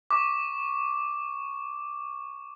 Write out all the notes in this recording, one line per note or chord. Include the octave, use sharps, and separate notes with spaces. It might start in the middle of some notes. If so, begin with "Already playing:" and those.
C#6 D6